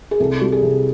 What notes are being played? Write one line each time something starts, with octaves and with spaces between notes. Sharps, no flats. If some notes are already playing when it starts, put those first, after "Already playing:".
G#4
C2 A4
G3
G#4
C2